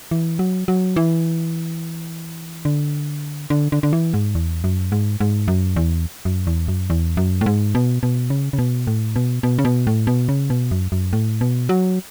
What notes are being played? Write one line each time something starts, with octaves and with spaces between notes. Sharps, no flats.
E3
F#3
F#3
E3
D3
D3
D3
D3
E3
G#2
E2
F#2
G#2
G#2
F#2
E2
F#2
E2
F#2
E2
F#2
A2
G#2
B2
B2
C#3
C#3
B2
A2
B2
B2
C#3
B2
A2
B2
C#3
B2
F#2
F#2
A2
B2
F#3